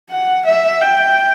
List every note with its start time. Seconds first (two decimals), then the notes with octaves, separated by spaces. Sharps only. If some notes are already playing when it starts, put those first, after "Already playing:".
0.10 F#5
0.46 E5
0.81 G5